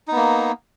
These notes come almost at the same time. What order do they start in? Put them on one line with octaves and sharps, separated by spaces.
D#4 B3 A#3